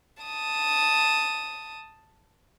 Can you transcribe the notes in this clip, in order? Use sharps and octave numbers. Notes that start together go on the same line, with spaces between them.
A5 D#6